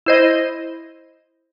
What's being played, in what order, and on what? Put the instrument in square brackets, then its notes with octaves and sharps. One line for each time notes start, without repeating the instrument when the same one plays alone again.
[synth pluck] E4 C5 D#5